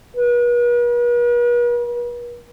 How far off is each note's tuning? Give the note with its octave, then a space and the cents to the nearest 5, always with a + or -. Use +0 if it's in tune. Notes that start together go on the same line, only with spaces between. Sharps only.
B4 -45